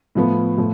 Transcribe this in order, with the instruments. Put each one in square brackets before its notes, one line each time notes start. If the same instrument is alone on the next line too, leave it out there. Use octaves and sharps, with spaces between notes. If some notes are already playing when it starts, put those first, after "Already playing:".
[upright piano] A2 F3 B3
A2 F3